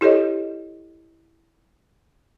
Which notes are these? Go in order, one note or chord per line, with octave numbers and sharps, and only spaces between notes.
E4 G4 A4 C#5 D#5